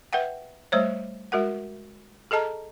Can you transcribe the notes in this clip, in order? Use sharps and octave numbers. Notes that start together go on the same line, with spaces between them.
B4 E5 F#5 G5
G3 A3 C5 C#5
G#3 F#4 A#4 F#5
G#4 A4 D#5 A5 A#5